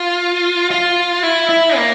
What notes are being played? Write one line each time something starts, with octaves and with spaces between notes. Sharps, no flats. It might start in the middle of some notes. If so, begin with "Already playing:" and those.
Already playing: F4
F4
E4
E4
A#3